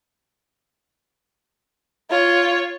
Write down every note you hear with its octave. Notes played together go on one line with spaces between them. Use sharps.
F4 C#5